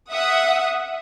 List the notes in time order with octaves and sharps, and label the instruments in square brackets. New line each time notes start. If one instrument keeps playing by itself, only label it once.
[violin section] E5 F#5 D#6